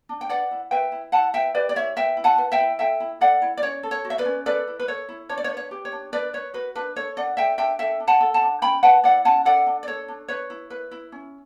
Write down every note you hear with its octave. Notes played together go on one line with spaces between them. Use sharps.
D4
G5
B4 D5 F#5
E4
B4 E5 G5
E4
E4 F#5 A5
B4 E5 G5
G4 B4 D5
D5
E4 C#5 E5
B4 E5 G5
E4
F#5 A5
B4
E5 G5
E4
A4 E5 G5
E4
A4 D5 F#5
E4
D5
C#4 C#5
A4
C#5
F#4
E5
B4 D5
C#4
A4 B4 D5
E4
B4
A4 C#5
E4
D4 C#5
D5
C#5
B4
C#5
G4
C#5
D4
D4 B4 D5
B4 C#5
F#4 B4
D4 B4
A4 C#5
D4 D5 F#5
A4 E5 G5
D4 E5 G5
A4 E5 G5
D4
F#5 A5
A4
F#5 A5
D4
C#4 G5 B5
B4 F#5 A5
E4 D5 F#5
C#4 F#5 A5
A4 D5 F#5
D4
D5
A4 C#5
D4
B4 C#5
E4
B4
E4
C#4